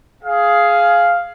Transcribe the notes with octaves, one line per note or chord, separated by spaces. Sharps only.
G#4 F5